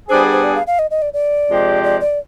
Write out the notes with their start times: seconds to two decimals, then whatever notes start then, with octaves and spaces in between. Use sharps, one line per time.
0.08 G3 B3 D4 G#4 C5
0.32 C5
0.44 D5
0.55 F5
0.67 F5
0.79 D#5
0.91 D#5
1.02 D5
1.13 D5
1.48 C3 F3 G#3 D4 G4
1.84 D5
2.01 D5